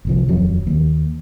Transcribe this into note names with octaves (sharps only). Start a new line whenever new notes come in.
G1 C2 F3
D#1 F2 F#3
D#2